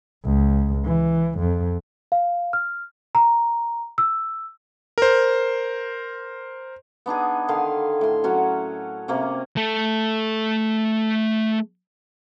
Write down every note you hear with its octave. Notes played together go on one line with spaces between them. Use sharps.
C#2
E3
F2
F5
F6
A#5
E6
A#4 C5
B3 D4 D#4 G#4
D3 D#3 F5 C6
A2 C6
F#3 C#4 F#4
C3 A#3 C#4
A3 A4